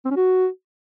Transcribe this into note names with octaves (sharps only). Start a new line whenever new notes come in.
C4
C#4
F#4